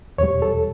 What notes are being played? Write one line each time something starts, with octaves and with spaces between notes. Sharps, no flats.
E2 B2 G3 C#5
A4